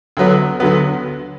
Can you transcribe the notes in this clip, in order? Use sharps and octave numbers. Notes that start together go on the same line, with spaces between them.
D2 D3 F#3 B3
D2 D3 F#3 B3